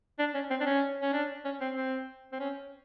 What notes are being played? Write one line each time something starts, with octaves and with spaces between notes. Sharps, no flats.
D4
C#4
C4
D4
C#4
C#4
D4
C#4
C4
C4
C4
C#4